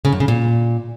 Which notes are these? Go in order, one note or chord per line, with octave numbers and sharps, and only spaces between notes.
C#3
F#2
C#3
A#2